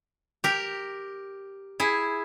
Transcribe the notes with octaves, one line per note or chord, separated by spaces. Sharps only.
G4 A#4
E4 G#4